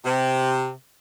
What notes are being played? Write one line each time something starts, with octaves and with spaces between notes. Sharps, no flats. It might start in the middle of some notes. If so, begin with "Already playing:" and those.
C3